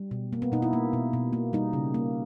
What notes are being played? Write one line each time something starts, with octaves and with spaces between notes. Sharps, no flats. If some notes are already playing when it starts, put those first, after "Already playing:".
Already playing: G3
B2
A#3
B3
B2 D#4
E4
A#3
B2
B2
A#3
G3 D#4
C#3
A#3